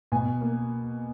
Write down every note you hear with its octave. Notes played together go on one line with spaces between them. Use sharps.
B2 G#5
A#3